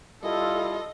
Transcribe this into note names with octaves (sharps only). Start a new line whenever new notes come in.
G3 E4 F4 A4 D#5